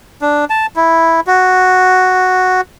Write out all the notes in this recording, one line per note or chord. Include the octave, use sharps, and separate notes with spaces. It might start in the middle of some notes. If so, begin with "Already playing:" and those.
D4
A5
E4
F#4